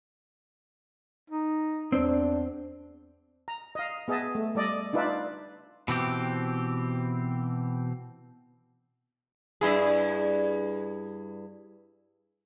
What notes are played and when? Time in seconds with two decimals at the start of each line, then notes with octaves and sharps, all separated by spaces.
1.30 D#4
1.92 E2 C4 D4
3.48 A#5
3.75 D#5 F5
4.08 B3 G#4 D#5 E5 A5
4.35 A3
4.55 G3 A4 D5 D#5
4.93 D4 D#4 F4 B4 D5 E5
5.88 B2 E3 C4 G4
9.61 G2 E4 G#4